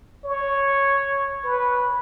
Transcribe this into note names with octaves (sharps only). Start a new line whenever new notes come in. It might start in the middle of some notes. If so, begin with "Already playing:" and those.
C#5
B4